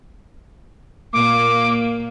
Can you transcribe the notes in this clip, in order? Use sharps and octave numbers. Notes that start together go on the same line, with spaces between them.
A#2 A#3 D6